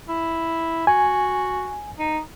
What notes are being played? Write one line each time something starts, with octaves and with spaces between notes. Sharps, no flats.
E4
F#4 G#5
D#4